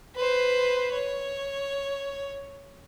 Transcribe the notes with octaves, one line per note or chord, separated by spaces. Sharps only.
B4 C5
C#5